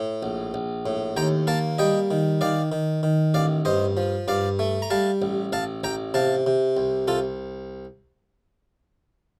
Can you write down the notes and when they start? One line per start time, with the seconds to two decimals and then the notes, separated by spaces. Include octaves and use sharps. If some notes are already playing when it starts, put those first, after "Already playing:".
Already playing: A2
0.23 A#1
0.54 A#1
0.86 A2
1.17 D#2 G5 A#5
1.47 A#3 F5 A5
1.78 G3 D#5 G5
2.11 D#3
2.41 D#3 D5 F5
2.72 D#3
3.03 D#3
3.34 A1 D5 F5
3.65 G2 C5 D#5
3.97 F3
4.28 G2 D5 F5
4.59 A3
4.82 A#5
4.90 G3 F5 A5
5.22 A1
5.52 A1 F5 A5
5.84 A1 G5 A#5
6.14 C3 F5 A5
6.46 C3
6.77 C2
7.08 C2 F4 A4